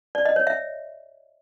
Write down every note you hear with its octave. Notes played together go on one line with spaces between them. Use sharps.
D5
D#5
C#5
E5